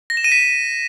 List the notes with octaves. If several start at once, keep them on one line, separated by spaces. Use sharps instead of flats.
A#6
E7
D#7
B6